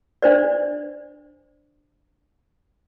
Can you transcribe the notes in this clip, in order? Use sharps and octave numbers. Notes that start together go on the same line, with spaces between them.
D4 C5 D5